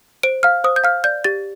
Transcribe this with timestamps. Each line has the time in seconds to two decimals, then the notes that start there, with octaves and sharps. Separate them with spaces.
0.23 C5 D7
0.43 F5 F6
0.64 C5 D#6
0.76 G6
0.84 F5 F6
1.04 D5 G6
1.24 G4 A6